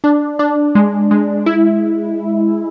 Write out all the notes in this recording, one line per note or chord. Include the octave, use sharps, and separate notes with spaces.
D4
D4
G#3
G#3
E4